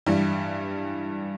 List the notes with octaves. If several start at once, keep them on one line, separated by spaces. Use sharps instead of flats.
G2 E3 G3